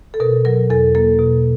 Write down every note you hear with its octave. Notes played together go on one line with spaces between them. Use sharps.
A4
B2 A#4
F#3 A#4
E2 A4
A#3 A4
B2